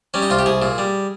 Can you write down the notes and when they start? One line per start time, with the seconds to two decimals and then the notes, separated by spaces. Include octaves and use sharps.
0.14 G3 C#4
0.22 D#4
0.30 C2 F4
0.39 G4
0.46 C2 G#4
0.62 A#2
0.78 G3